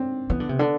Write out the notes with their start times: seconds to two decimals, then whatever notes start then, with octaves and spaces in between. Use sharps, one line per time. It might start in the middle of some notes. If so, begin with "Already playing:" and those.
Already playing: C4 D4
0.30 E3 B3
0.40 D3
0.49 C3
0.59 D3